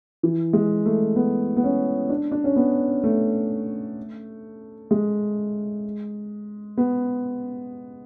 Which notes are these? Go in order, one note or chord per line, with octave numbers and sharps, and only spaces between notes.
E3
G#3
A3
B3
B3
C#4
D4
D4
C#4
B3
A3
G#3
B3